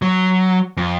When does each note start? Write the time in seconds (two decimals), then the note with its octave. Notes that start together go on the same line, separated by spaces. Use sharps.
0.02 F#3
0.77 F2